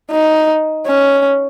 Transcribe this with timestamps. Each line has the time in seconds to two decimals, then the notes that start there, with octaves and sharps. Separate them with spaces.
0.11 D#4
0.86 C#4